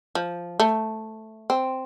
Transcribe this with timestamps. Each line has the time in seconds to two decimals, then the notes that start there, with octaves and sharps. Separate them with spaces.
0.15 F3
0.60 A3
1.50 C4